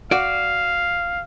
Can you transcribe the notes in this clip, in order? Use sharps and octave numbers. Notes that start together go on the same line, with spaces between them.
F#4 D5 F5